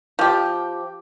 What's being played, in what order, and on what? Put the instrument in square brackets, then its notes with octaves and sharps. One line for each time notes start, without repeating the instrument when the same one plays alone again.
[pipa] F3 G4